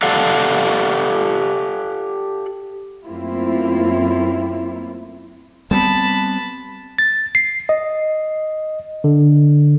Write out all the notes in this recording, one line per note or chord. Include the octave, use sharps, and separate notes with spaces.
G4 A4 D5 F5 F#5
F#2 A3 A#3 C4 E4 F4
G3 B3 C4 A5 B5
A6
C7
D#5
D3